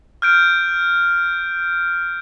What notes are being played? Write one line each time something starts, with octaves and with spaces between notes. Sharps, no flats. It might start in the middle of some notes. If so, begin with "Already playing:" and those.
F6 G6 D7